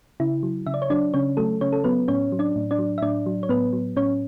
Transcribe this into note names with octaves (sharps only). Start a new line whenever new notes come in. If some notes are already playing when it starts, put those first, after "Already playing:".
C#3 E4
F#3
C#3 E5
D5
C#5
F#3 D4 D5
C#3 C#4 C#5
F#3 A3 A4
C#3 C#4 C#5
A4
F#3 B3 B4
A2 C#4 C#5
F#3
D4 D5
A2
D4 D5
F#3
E5
A2 D4 D5
F#3
C#5
A2 B3 B4
F#3
A2 C#4 C#5